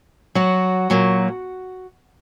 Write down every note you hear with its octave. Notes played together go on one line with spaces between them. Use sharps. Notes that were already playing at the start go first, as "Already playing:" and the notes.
F#3 F#4
A#2 F#3 A#3